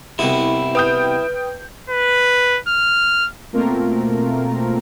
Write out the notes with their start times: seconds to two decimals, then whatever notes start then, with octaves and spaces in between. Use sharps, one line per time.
0.19 C2 B2 E4
0.75 B4 G5 D#6 G6
1.90 B4
2.68 F6
3.53 B2 A3 A#3 C4 F4 A#4